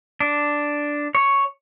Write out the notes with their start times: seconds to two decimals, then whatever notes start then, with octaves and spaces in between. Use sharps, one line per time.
0.20 D4
1.15 C#5